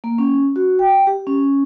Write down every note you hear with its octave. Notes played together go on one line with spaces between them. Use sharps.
A#3
C#4
F#4
G5
G4
C#4